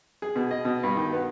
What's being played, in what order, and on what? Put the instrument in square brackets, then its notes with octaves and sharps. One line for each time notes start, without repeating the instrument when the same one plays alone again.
[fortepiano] G#4
B2
D#5
B2
G2
D#3
B3